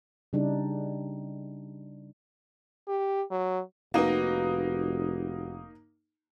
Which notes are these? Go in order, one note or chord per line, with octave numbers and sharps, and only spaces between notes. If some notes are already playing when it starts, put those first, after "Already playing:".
C#3 G3 D4 D#4
G4
F#3
F1 A#3 D#4 F#4 B4